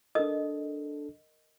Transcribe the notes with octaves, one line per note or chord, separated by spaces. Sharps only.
D4 A4 A#4 D#5 D#6